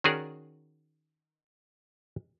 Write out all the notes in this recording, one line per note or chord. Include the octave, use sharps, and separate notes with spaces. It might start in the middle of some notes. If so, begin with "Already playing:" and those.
D#3 C#4 F#4 G#4 A#4 D5